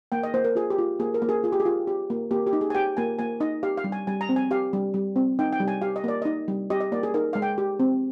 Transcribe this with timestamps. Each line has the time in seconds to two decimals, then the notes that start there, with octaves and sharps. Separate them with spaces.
0.12 A#3 G5
0.23 D#5
0.34 A#3 C5
0.44 A#4
0.55 F4 G#4
0.70 G4
0.78 F4
1.00 A#3 G#4
1.14 A#4
1.22 A#3
1.29 G#4
1.44 F4 G#4
1.52 G4
1.60 G#4
1.65 F4
1.88 G4
2.10 A#3
2.31 A#3 G4
2.47 G4
2.53 D#4
2.61 G#4
2.70 G#5
2.75 G4 G5
2.97 A#3 G#5
3.19 A#3 G#5
3.40 D#4 D#5
3.63 G4 F5
3.77 F5
3.84 G3
3.92 G#5
4.07 G3 G#5
4.21 A#5
4.29 C4
4.36 G#5
4.51 G4 F5
4.73 G3
4.94 G3
5.16 C4
5.39 D#4 G5
5.53 G5
5.60 G3
5.68 G#5
5.82 G4 F5
5.96 D#5
6.04 A#3 D5
6.22 D#4 D#5
6.48 G3
6.70 G4 D#5
6.81 D#5
6.92 A#3 D5
7.03 G#4
7.14 D#4 A#4
7.33 G#3 F5
7.42 G5
7.58 G4
7.80 C4